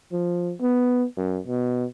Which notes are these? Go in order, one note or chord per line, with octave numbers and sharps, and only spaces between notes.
F3
B3
F#2
B2